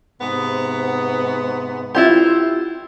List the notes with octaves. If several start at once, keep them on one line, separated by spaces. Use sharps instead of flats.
G#2 C3 B3
E4 F4 G4